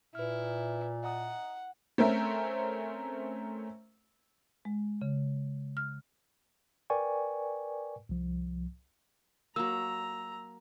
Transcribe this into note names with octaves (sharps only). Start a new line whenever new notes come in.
A#2 E4 B4 F6
D#5 F#5 A#5 D#6
A3 C4 C#4 A#4 E5
G#3
C#3
F6
A#4 B4 D5 G5 G#5 C#6
C2 F3
F#3 A#3 A#5 E6